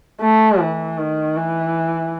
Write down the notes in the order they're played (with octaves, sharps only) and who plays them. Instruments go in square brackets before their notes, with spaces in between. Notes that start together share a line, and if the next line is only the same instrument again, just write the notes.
[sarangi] A3
E3
D#3
E3